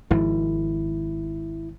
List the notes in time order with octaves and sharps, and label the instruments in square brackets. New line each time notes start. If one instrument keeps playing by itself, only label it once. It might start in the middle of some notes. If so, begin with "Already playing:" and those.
[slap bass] G#1 G#2 F3 [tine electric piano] E4